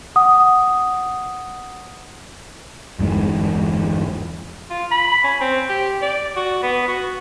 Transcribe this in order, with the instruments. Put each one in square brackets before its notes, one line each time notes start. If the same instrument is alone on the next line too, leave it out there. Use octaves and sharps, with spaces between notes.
[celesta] F#5 D#6
[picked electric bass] G1 E2 G#2 G#3
[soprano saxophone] F4
B5
C#4
C4
G4
D5
F#4
B3
F#4